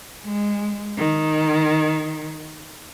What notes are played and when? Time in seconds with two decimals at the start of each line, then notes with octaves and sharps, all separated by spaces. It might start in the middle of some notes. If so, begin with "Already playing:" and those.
0.25 G#3
0.98 D#3